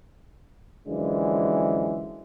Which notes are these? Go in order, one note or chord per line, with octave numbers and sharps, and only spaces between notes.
F#2 D3 E3 F3 G#3